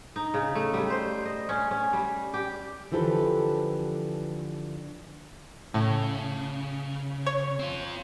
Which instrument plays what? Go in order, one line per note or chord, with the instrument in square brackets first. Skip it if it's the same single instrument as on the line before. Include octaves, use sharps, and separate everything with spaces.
[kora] D#4
C#3
A3
G3
C5
D#5
C#4
C#4
G3
G4
[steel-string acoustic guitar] D3 E3 F3 G4 A4 B4
[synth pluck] A2 [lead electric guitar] C#3
[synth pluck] C#5
[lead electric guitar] C4 F4